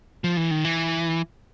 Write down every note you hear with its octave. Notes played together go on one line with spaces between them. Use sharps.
F3
E3
D#3
E3